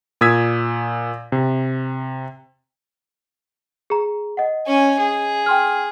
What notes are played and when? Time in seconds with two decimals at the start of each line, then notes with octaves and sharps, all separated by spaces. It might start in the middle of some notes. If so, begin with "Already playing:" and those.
0.21 A#2 D#6 E6 G#6 B6
1.32 C3
3.90 G#4 A#5
4.37 D#5 F#5
4.67 C#4 G#5
4.99 G#4
5.46 G5 C6 F6